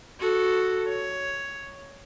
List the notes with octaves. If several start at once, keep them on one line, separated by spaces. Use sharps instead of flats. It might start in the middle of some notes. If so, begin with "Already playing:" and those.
F#4 A4
C#5